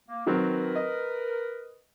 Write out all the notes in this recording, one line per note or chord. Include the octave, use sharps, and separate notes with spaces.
A#3
D#3 F#3 C4 A#4 B4
D#5